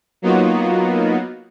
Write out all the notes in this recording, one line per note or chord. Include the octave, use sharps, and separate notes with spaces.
F#3 A#3 B3 D#4 F4 F#4